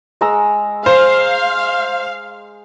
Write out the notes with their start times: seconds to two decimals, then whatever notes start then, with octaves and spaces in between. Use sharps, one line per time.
0.21 G#3 A#5 E6
0.86 C5 F5